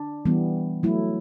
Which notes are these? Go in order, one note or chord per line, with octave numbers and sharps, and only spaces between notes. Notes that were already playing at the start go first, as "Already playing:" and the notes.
Already playing: D4
E3 G3 B3
F#3 A3 E4